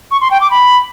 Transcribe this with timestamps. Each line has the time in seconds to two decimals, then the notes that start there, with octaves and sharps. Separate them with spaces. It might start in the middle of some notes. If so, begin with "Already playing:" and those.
0.11 C#6
0.21 C6
0.31 G5
0.41 D6
0.51 B5